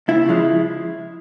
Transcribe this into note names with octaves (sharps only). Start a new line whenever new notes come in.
C#2 E4
C#3 F3 G#3